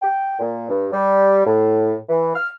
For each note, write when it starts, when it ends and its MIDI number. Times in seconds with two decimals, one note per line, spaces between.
0.02 0.37 79
0.39 0.66 46
0.69 0.87 43
0.92 1.45 55
1.46 1.95 45
2.09 2.34 52
2.35 2.48 89